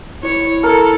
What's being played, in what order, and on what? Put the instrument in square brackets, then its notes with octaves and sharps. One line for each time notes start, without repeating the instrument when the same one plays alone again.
[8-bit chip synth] E4 [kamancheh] C#5
[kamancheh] A4 [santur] A#4